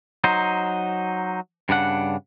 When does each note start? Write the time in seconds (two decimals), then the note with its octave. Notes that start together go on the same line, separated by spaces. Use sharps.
0.24 F#3 D#4 C5
1.69 G2 C#3 D4 F#5